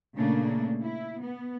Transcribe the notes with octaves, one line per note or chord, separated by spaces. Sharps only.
A#2 C#3 A3 A#3 D4
E4
B3